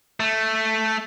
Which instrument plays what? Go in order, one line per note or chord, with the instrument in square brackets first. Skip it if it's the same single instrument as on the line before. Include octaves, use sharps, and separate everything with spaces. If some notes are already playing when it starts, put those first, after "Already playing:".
[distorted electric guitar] A3